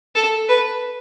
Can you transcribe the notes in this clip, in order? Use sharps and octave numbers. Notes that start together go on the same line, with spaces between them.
A4
B4